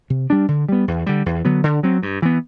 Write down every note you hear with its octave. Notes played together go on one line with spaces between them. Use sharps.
C3
G3 D4
D3
G3 B3
E2
D3 G3
E2
D3 F#3 B3
D3
F#3 C4
G2
E3 B3